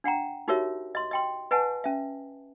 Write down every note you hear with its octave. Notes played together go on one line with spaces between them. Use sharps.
D4 F#5 G5 A#5
D#4 F#4 G4 A#4 C#5 E5
D#5 C6
D#5 G5 C6
B4 D#5 F#5 G#5 A5
C#4 E5